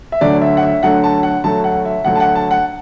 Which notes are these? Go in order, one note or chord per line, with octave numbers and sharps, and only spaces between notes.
E5
D2 D3 F#3 A3 D5
E5
F#5
E5
D2 D3 F#3 A3 F#5
A5
F#5
D2 D3 F#3 A3 A5
F#5
E5
D2 D3 F#3 A3 F#5
A5
F#5
A5
F#5